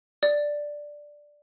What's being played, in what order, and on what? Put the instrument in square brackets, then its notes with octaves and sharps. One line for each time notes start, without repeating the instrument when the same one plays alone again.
[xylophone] D5